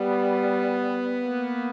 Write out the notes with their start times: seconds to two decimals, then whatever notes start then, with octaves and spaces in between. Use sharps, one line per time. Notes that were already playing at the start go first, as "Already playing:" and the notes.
Already playing: G3 B3
1.25 A#3